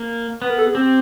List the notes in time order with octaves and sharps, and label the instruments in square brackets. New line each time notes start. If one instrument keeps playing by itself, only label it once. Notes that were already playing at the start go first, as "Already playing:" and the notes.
Already playing: [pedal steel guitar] A#3
[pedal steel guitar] B3 [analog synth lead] B4
[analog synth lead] A#4
A4
G#4
[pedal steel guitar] C4 [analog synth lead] G4